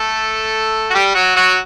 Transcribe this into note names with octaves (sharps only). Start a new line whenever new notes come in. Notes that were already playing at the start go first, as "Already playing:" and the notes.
Already playing: A3 A4
F#4
G3 G4
F#3 F#4
F#3 F#4